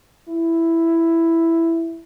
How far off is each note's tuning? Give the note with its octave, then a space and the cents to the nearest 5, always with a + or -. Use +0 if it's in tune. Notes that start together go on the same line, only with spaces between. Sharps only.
E4 +5